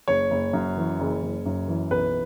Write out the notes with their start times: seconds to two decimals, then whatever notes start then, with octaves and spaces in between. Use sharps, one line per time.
0.08 F#1 C#5
0.31 F#1
0.53 F#2
0.77 E3
1.00 F#1
1.22 F#1
1.46 F#2
1.68 E3
1.91 B1 B4